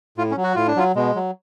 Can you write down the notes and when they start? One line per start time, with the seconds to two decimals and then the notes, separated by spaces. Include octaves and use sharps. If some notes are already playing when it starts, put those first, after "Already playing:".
0.18 A2 F4
0.31 C#4
0.37 F#3
0.44 F#4
0.55 A2 F4
0.67 D4
0.77 F#3 F4
0.96 B2 G#3
1.15 F#3